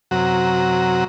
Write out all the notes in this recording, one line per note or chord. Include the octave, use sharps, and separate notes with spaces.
F#2 C3 F#3 F#4 A#5